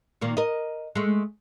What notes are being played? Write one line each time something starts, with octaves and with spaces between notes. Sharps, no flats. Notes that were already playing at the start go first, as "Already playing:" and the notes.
A#2 D#3 A#3
A#4 D#5
G#3 A3